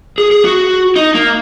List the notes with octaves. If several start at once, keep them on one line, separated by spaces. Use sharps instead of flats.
G#4
G#4
F#4
D#4
A#3